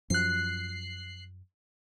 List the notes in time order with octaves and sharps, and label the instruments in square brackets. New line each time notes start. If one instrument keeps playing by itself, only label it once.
[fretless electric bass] F#2 F3 [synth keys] F#6 C7